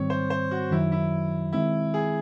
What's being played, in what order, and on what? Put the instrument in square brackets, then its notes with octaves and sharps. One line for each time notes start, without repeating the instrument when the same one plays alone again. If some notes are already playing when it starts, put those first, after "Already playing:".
Already playing: [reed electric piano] G#2 D#3 G3 C4 [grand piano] C#5
[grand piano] C5
C5
F#4
[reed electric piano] F#2 D#3 F#3 [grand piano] E4
[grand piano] E4
[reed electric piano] D#3 G#3 C4 [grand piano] E4
[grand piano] G#4